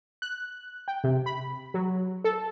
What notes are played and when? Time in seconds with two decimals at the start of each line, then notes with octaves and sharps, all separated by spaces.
0.22 F#6
0.88 G5
1.04 C3
1.26 B5
1.74 F#3
2.24 A4